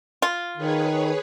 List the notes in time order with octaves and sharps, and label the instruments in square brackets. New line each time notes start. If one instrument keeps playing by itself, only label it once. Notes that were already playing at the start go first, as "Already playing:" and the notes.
[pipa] F4
[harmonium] D#3 [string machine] G#4 B4 C#5